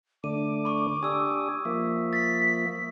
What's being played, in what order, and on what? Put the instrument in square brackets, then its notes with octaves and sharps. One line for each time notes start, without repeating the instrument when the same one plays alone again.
[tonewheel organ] D3 A3 D4 [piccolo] D6 [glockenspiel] D#7
[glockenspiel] B5 C#6
[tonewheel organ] D4 G4 G#5 [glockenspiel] D#6 E6
[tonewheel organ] F3 A#3 E5
[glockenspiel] A6 [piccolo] B6